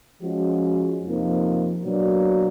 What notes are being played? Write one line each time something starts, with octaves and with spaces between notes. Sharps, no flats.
F3 G#3 C#4 F#4
F2 C3 F3 A#3 D#4
B2 F#3 A#3 D4